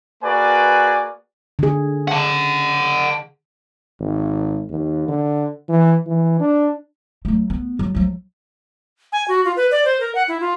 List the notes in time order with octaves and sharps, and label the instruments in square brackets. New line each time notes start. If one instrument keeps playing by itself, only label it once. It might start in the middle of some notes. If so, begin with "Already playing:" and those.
[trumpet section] A#3 F#4 G#4 B4 D5 G#5
[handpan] D3 G#4
[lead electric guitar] F#5 A5
[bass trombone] G#1
D#2
D3
E3
E3
D4
[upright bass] F#3 A3
B3
F#3
F3 F#3
[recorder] G#5
F#4
F4
B4
D5
C5
A#4
F#5
E4
F4